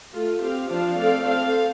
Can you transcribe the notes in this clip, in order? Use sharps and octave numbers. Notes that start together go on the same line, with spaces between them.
A3 F4 A4
C4 G4 F5
F3 D4 F4 C5 F5
A3 C4 A4 D5 F5
C4 A4 C5 F5